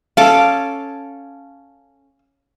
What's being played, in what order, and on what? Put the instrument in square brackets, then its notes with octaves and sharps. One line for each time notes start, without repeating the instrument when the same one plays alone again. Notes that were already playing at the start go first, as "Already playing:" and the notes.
[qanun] C#4 A4 D6 [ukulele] F5